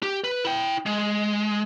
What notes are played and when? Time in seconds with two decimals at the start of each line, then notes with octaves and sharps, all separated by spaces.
0.03 G4
0.24 B4
0.45 E4 G5
0.86 G#3